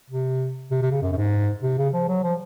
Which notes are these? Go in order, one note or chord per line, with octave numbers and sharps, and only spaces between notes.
C3
C3
C3
C#3
F#2
F#2
G#2
C3
C#3
F3
F#3
F3